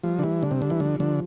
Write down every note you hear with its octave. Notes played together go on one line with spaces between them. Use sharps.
F3 G3
D3
E3 G3
D3 D4
C3
D3 G4
E3
D3 F3
D3 F3